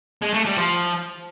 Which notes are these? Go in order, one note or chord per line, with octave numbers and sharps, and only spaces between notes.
G#3
A3
G3
F3